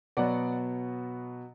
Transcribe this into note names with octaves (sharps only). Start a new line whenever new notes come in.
B2 F#3 B3 D5 F#5